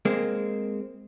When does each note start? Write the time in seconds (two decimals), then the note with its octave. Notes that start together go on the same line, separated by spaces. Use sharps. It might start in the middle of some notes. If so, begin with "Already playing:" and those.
0.05 G#3 A#3 C4